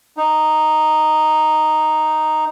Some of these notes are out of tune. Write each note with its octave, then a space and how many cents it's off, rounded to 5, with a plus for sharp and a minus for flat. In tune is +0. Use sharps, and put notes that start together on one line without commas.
D#4 -5